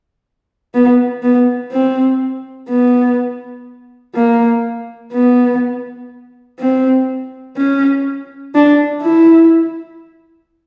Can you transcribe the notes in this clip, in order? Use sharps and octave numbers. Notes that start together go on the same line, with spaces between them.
B3
B3
C4
B3
A#3
B3
C4
C#4
D4
E4